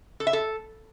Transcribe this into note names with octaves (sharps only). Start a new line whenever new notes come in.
A4
E5
A4